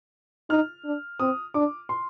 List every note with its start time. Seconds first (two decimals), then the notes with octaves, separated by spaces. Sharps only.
0.50 D#4 F6
0.85 D4
1.20 C4 D#6
1.54 D4 D6
1.89 C6